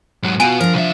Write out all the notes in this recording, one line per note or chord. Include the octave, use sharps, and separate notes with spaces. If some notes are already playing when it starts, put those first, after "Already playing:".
G#2 F#3
B3 F4 F#4 G#5 D7 D#7
F3 D4 A#4
C2 E5